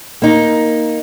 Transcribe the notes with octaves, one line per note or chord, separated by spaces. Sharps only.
A#3 D#4